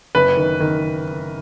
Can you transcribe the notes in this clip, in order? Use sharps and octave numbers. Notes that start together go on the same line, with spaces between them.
F#1 B4
D#3
D#3